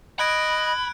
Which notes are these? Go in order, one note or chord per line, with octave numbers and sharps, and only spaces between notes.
D#5 B5 F#6 G#6 D7